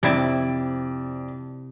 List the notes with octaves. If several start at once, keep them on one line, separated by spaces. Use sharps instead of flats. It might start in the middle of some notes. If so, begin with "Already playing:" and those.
F2 C3 E4 D5 A5 D7